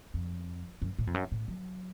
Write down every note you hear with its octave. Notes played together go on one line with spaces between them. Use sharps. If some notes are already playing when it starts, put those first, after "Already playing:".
F2
F#2
A2
F2
F#2
A2
F#3